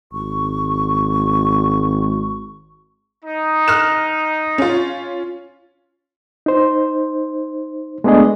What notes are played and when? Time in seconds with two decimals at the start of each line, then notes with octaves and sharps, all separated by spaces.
0.12 G#1 C#6
3.25 D#4
3.68 F6 F#6 E7
4.58 C#4 F4
6.46 D#4 C5
8.04 G#3 A3 B3 D4 G#4 D#5